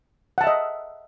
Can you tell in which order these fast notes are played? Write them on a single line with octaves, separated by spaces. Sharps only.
F#5 A5 E5 D#5